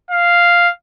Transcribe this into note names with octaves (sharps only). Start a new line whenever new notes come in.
F5